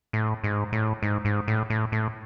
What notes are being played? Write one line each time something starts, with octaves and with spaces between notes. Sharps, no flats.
A2
G#2
A2
G#2
G#2
A2
A2
A2